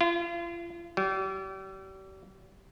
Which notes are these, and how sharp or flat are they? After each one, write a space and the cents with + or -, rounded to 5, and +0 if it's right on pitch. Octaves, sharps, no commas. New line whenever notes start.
F4 -40
G3 -40